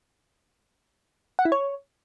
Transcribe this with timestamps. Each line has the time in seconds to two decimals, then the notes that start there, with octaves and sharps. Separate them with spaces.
1.39 F#5
1.45 E4
1.52 C#5